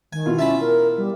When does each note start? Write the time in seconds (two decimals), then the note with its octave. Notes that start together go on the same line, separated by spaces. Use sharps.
0.13 D#3 G#5
0.26 B2 E3 F4
0.39 C#4 E5 A5 B5
0.60 A#4
0.97 G3